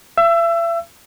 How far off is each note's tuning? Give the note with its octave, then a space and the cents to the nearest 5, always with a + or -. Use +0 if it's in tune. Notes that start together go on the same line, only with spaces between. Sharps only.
E5 +40 E6 +20